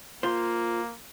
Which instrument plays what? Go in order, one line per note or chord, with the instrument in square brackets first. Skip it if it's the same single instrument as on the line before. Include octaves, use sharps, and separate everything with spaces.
[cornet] A#3 [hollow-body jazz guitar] F4 C5